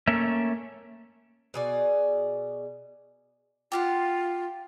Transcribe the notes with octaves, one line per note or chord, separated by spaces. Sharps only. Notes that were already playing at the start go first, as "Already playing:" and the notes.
A3 A#3 C#4 E5
B2 G#4 D5
F4 G4 F5 F#5